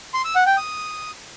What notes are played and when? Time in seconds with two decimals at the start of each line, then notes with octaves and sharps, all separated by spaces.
0.14 C6
0.25 E6
0.35 F#5
0.46 G5
0.57 D#6